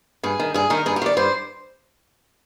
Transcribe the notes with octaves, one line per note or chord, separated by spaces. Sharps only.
G2 G#4
D#3
G2 G#4
D#3 A#4
G2 G#4
G4
D#3 D5
G2 C5